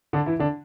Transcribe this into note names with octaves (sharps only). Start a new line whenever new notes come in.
D3 D4
E3 E4
D3 D4